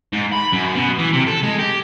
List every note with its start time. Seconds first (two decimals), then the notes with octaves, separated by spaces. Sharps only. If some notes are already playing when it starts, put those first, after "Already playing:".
0.13 G#2
0.33 B5
0.53 F#2
0.75 B2
0.99 E3
1.13 C3
1.27 A4
1.43 G#3
1.59 G4